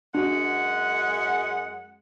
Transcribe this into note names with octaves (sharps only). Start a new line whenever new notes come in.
F#2 G#3 D4 F#4 F#5